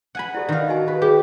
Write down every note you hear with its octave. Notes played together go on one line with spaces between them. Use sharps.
F#5 G#5 B5
E4 G4 A4 D5
D#3 F5
D#4 F#4 G#5
G4 B4
G4 G#4 A#4